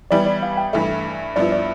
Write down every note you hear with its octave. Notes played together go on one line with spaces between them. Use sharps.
E3 G3 B3 D5
D5
F5
G5
G2 E3 A3 E5
G2 F3 B3 E4 D5
D5